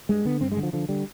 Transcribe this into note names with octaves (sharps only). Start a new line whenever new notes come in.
G2 G#3
D3 B3
G2 C4
G#3
D3
F3
D3 F3
D3 G3